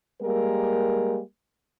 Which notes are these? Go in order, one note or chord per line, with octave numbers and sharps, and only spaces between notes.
G3 G#3 A#3 A#4